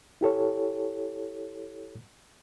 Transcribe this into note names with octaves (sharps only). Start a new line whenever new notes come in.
E4 G4 A4 C#5